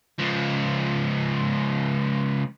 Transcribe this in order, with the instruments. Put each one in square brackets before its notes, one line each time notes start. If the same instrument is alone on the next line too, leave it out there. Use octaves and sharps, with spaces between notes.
[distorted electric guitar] C#2 F3